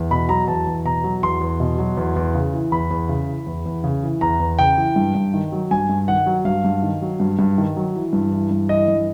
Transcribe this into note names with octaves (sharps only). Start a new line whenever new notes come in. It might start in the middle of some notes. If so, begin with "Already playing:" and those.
Already playing: E2
B2 B5
F#3 A#5
E2 A5
E2
B2 A#5
F#3
E2 C6
E2
B2
F#3
E2
E2
C#3
E3
E2 B5
E2
C#3
E3
E2
E2
C#3
E3
E2 A#5
E2
C#3 G5
E3
G2
G2
D#3
F#3
G2 G#5
G2
D#3 F#5
F#3
G2 F5
G2
D#3
F#3
G2
G2
D#3
F#3
E3
G2
E3
G2
E3 D#5
G2